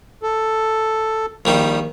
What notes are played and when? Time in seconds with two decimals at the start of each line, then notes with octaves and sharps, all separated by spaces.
0.23 A4
1.45 A#1 D#3 G3